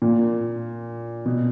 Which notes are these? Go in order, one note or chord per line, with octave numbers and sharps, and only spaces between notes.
A#2
B2